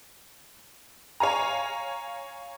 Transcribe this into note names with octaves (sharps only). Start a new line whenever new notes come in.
C#5 F5 G#5 A#5